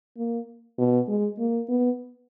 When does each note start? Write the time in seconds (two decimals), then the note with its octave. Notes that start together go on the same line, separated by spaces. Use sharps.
0.17 A#3
0.78 B2
1.08 G#3
1.39 A#3
1.69 B3